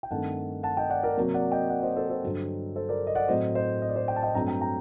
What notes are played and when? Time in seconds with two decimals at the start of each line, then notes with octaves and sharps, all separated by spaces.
0.03 G5
0.11 G2 D#3 A3 C4 F#5 A5
0.63 F#5 A5
0.77 D#5 G5
0.90 D5 F#5
1.03 A#4 D5
1.17 C3 F#3 A#3
1.34 D5 F#5
1.52 D#5 G5
1.70 D5 F#5
1.83 C5 D#5
1.96 A4 C5
2.09 A4 C5
2.23 G2 D3 F#3
2.75 A4 C5
2.89 A#4 D5
3.07 D#5
3.15 D5 F#5
3.28 A2 F#3 C4 C5 D#5
3.55 C5 D#5
3.82 D#5
3.89 D5
3.96 C5 D#5
4.08 G5
4.16 A5
4.23 D#5 G5
4.35 G2 F#3 A3 C4 G5 A#5
4.48 G5 A#5
4.61 G5 A#5